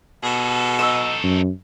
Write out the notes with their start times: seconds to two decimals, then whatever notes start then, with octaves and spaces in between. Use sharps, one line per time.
0.23 B2 G#4 A4
0.79 D#4 A4 D#5 C#6 E6
1.23 F#2